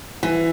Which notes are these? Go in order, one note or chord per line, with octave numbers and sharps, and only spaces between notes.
E3